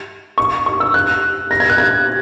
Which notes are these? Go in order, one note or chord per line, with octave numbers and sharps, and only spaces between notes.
C#6
C#6
E6
F#6
A#6
G#6
F#6
G#6